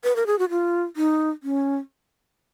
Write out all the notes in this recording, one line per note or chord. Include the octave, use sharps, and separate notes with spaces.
B4
A#4
G#4
F#4
F4
D#4
C#4